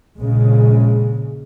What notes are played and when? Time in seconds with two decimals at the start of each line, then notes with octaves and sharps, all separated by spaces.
0.19 A#1 C#3 G#3